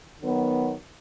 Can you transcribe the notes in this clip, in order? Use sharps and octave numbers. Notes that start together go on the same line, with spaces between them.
D#3 F#3 B3